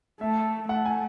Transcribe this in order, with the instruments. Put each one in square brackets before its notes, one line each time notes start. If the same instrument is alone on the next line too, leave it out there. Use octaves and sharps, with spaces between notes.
[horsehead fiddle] A3 [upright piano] E5
[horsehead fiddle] A3 [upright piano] F#5
[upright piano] G#5